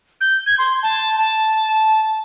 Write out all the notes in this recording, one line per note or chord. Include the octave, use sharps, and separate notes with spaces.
G6
G#6
C6
A5
A5